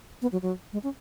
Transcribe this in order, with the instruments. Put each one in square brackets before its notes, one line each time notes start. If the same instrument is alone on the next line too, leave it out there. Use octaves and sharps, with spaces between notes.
[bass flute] B3
F#3
F#3
G#3
C#4